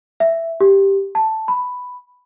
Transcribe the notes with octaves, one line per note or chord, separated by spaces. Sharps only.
E5
G4
A5
B5